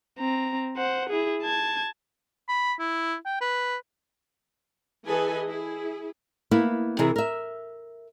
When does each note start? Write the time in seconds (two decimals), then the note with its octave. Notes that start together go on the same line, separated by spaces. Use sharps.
0.19 C4 A#5
0.77 C5 F#5
1.10 E4 G#4
1.43 A5 G#6
2.49 B5
2.79 E4
3.26 G5
3.41 B4
5.07 E3 G#4 A4 B4 D#5 G#5
5.49 E4 G#4
6.51 A#3 B3 E4
6.99 C3 E3 E4 G#4 A#4
7.16 A#4 E5